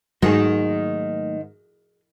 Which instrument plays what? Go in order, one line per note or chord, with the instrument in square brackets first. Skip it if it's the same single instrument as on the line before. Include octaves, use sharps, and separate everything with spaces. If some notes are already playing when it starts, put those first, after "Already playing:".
[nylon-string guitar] G#2 [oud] D#3 [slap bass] F#3 A3 A#3 [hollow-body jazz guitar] F#4 G#4